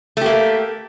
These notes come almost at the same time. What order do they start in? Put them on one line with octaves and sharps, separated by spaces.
A3 G4 A#3